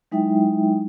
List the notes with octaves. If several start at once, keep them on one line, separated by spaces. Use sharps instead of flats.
F#3 G#3 D#4 E4 E5 G5